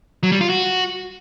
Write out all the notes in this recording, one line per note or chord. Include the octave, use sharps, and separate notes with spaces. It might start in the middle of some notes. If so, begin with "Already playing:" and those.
F#3
G3
F4
F#4